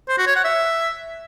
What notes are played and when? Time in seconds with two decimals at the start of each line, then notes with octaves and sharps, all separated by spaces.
0.09 C5
0.18 F#4
0.27 C#5
0.36 F#5
0.45 E5